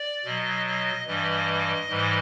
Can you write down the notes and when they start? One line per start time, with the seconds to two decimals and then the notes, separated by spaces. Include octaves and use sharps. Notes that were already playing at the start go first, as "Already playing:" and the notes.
Already playing: D5
0.25 B2 F#3 D#5
0.66 D#5
1.07 G2 E3 G3 D#5
1.89 G#2 E3 G3